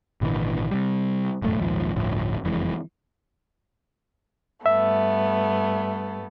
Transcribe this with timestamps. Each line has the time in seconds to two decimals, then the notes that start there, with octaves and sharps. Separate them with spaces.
0.21 G#1 A#2 D3 E3
0.71 C3 G3
1.42 E1 F#2 A2 A3
1.59 A#1 D#2 G#2 F3
1.96 G1 D2 A2 F3
2.44 F#1 F2 E3 G#3
4.66 G2 A3 B3 E5